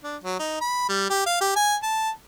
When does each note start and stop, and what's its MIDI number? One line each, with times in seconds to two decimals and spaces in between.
0.04 0.17 62
0.24 0.35 54
0.39 0.60 63
0.61 0.85 83
0.89 1.07 55
1.10 1.24 67
1.26 1.36 77
1.41 1.52 67
1.56 1.76 80
1.83 2.10 81